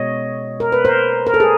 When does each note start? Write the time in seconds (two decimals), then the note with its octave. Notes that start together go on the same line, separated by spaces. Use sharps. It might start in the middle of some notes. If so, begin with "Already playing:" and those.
Already playing: B2 G#3 B3 C#5 D#5
0.60 A#4
0.72 B4
0.85 A#4 C5
1.27 A#4
1.34 A4
1.40 G#4